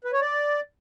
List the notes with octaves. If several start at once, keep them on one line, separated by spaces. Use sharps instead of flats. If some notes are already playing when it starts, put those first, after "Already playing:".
B4
C#5
D5